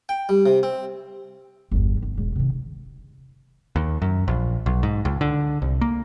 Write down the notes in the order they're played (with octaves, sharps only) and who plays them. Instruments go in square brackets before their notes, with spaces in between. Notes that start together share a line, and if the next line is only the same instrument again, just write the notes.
[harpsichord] G5
G3
C3
C4
[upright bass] G1 E2
G1
E1 G#2
C3 D#3
[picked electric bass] D#2
F#2
A#1
B1
G#2
C#2
D3
C2
A#3